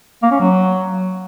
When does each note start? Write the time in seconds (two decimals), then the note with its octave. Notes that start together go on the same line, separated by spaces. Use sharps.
0.23 A#3
0.31 C#4
0.40 F#3